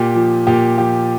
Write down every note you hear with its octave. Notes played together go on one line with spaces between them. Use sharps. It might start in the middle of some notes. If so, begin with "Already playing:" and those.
Already playing: A#2 G4
F3
A#2 G4
F3 G4